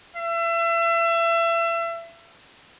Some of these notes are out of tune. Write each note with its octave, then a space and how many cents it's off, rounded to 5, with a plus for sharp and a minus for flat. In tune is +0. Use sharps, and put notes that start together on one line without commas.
E5 +30